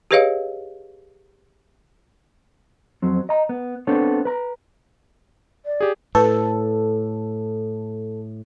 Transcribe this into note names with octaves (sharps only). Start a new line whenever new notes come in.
G4 G#4 B4 C#5 D#5 F5
F2 F#3 C4
D#5 A#5
B3
B3 C4 D4 A4 C5 C#5
B4 A#5
D5
G4 G#4
A2 A4 B4